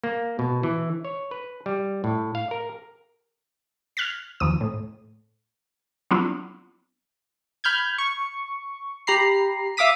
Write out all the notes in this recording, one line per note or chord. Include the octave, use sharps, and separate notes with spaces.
A#3
B2
E3
C#5
B4
G3
A2
F5
A#4
F6 F#6 G#6 A6 B6
D#2 F3 D#6
A2
F#3 B3 C4 D4 E4 F4
B5 F6 G6 G#6
C#6
G4 A#5 B5 C7
E5 F5 D6 D#6 B6 D#7